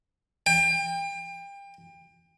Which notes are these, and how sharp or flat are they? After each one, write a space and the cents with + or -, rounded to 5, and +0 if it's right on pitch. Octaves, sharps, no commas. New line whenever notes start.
G5 +30